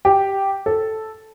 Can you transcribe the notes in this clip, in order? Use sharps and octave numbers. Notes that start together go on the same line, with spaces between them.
G4
A4